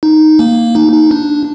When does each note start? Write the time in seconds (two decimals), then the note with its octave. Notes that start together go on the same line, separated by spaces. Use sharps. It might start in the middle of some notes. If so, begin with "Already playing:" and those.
0.03 D#4
0.39 A#3
0.75 D#4
0.92 D#4
1.11 D4